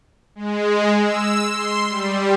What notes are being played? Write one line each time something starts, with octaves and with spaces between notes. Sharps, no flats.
G#3
E6
C6
G3